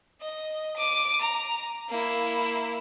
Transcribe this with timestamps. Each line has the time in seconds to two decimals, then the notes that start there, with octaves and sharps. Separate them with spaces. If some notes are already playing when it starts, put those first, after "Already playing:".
0.21 D#5
0.77 D6 D#7
1.21 A#5
1.89 A#3 E4